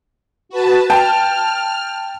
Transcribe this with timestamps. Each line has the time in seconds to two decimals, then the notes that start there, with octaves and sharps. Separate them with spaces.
0.49 F#4 B4 A5
0.90 G5 A5 F6